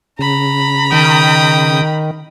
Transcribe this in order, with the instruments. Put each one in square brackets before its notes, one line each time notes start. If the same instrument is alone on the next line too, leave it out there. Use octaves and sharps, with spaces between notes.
[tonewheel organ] C#3 [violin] A#5 B5
[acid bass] D#3 [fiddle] G5 D#6